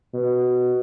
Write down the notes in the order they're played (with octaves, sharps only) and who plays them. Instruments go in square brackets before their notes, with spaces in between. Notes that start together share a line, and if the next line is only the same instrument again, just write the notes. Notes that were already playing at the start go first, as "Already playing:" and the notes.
[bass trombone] B2